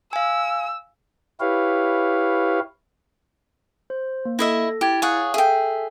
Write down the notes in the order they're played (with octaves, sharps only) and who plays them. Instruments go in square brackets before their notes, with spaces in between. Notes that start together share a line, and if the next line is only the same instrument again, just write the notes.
[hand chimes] F5 G#5 [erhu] E6
[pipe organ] E4 G4 B4 C#5 F5
[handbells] C5
A#3
[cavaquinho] E4 D#5 E5 [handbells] A4 A#6
[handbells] E4 G#6 A6 [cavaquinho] G4
[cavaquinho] G#4 C#5 F#5 [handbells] F5 D#6
[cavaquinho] G#4 G5 [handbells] A4 E5